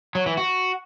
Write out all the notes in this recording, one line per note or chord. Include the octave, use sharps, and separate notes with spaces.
F#3
E3
F#4